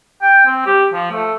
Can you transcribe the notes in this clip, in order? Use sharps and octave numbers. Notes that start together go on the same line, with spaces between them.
G5
C4
G4
F3
A3